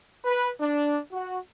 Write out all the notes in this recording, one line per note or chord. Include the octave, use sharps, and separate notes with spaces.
B4
D4
F#4